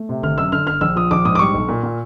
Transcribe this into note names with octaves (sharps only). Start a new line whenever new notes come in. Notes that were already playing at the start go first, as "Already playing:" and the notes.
Already playing: A3
C3
G1 F6
F#2 E6
D3 F6
G1 F6
A#1 E6
F3 D#6
A#1 D6
G#2 D#6
D6
G3 C#6
B1
A#2
A#2